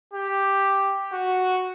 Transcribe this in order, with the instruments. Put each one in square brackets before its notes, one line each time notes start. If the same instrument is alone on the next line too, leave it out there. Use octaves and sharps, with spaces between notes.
[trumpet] G4
F#4